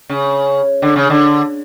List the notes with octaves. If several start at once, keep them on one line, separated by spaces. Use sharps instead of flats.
C#3
D3
C#3
D3